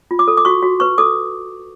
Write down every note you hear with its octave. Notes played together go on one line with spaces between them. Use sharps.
F4
D6
A4
D6
F#4 C#6
F#4
B4 C#6
A4 D6